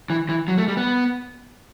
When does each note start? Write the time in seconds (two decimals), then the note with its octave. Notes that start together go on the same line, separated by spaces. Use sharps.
0.10 E3
0.29 E3
0.48 F#3
0.58 A3
0.68 G3
0.77 B3